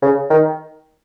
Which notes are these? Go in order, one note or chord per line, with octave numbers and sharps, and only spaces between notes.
C#3
D#3